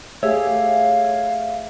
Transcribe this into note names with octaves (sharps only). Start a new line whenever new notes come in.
A3 G4 G#4 C#5 E5 F5